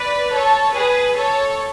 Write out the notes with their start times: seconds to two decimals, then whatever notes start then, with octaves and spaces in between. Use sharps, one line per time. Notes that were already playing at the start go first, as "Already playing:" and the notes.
Already playing: B4 D5
0.34 A4 C#5
0.74 G#4 B4
1.16 A4 C#5